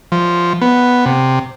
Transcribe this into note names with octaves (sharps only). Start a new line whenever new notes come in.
F3
B3
C3